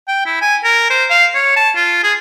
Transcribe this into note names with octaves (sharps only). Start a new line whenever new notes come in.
G5
E4
G#5
A#4
C5
F5
C#5
A5
F4
G#4